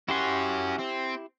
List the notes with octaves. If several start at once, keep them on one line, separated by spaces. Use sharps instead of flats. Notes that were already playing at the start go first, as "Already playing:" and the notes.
C#4 E4 F#4 G4 C6
C4